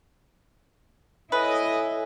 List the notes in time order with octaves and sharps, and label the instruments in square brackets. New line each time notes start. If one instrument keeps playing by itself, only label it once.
[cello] E4 E5 [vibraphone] A4 C#5 G#5 [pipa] B4 [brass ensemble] D#5